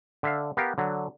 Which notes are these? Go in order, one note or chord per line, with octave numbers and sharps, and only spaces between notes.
D3 E5 F5
B3 G4 A#4 F5
D3 F#3